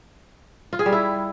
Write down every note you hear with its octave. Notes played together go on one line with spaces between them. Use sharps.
F4
G#4
G3
E4